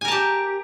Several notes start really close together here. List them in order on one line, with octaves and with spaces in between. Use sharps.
G#5 A#4 A5 G4